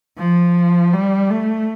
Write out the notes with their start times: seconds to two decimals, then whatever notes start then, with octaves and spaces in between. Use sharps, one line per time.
0.18 F3
0.93 G3
1.30 A3